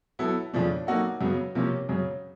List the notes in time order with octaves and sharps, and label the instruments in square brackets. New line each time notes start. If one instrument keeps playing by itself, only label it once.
[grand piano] F#3 B3 E4 A4
F2 C#3 F3 A3 D4
F#3 A#3 D#4 F#4 A4
F#2 C#3 F#3 B3
C3 F3 A#3 C#4
F#2 C#3 F#3